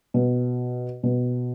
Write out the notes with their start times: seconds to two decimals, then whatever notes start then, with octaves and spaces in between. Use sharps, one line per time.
0.14 B2
1.03 B2